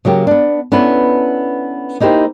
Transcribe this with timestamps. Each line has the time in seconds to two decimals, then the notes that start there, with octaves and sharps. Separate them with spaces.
0.05 C#3 F#3 A#3 G4
0.27 B3 D4
0.72 B3 C#4 D4 E4 A4 B4
2.00 A#3 D#4 E4 G4 C5